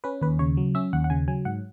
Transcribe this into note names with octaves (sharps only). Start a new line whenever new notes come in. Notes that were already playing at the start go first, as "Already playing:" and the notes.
C#4 B4
D#2 B4
C#3 C#5
F#3
C#4 E5
D#2 F#5
F#5
C#3 G#5
F#3 G#5
G#2 F#5